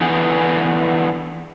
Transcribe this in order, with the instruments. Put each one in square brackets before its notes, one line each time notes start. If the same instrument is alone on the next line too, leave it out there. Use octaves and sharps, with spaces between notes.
[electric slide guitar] D3 E3 B3 G#4